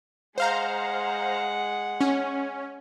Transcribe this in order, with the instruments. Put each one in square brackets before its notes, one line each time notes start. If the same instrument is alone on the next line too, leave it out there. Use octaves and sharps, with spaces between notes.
[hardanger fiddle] G#3 F#5 [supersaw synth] C5 F5 A#5
[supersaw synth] C#4